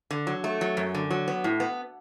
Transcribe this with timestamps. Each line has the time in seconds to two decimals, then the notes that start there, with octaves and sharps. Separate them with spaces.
0.11 D3
0.27 F#3
0.44 A3
0.61 F#3
0.77 F#2
0.94 D3
1.11 F#3
1.28 B3
1.44 A2
1.60 B3